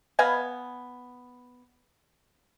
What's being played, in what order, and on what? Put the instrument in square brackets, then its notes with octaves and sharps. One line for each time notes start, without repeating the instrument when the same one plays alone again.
[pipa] B3 D#5 F5 G#5